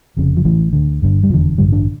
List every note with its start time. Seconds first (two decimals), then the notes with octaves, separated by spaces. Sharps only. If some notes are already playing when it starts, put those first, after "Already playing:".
0.17 F1 F2 C#3
0.37 F3
0.45 A1 A2 E3
0.73 D2 D3
1.02 G1 G2 D3
1.24 G3
1.30 F1 E2 D3 F3
1.58 A1 G2 D3 G3
1.72 D4